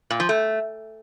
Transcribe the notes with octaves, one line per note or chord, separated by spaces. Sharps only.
A#2
F3
A3